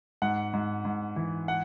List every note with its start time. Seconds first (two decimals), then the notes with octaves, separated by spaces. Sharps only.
0.22 G#2 F#5
0.53 G#2
0.85 G#2
1.16 E3
1.48 F#5